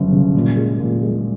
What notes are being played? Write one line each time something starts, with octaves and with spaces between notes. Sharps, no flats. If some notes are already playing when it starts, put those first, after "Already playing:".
Already playing: G1 F#2 C#3
C#3
A#2
G#3
A#2
G#3